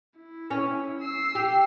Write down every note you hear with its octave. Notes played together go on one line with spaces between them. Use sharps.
E4
C#4
E6 C7
G4